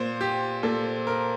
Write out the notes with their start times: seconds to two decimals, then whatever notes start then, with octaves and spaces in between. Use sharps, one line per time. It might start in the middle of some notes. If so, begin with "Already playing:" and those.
Already playing: A#2 C5
0.21 G4
0.63 A#2 A4
1.07 A#4